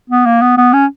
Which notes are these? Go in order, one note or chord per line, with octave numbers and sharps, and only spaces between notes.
B3
A#3
B3
B3
C#4